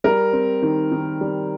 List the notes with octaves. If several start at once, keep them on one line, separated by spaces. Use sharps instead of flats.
G3 A#4
C4
D#3
D#3
G3